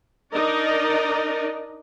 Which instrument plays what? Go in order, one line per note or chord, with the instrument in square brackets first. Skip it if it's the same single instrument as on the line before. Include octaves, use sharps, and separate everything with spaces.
[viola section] D4 D#4 A#4 D5 D#5